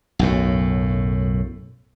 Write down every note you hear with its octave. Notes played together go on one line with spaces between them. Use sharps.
B1 F#2 A2